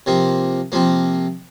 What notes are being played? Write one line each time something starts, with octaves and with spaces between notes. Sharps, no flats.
C3 F3 A#3
C3 F3 A#3